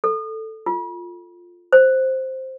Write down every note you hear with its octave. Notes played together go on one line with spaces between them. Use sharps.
A4
F4
C5